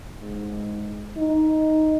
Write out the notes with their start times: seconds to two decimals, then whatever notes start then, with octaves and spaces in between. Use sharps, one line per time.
0.20 G#2
1.17 D#4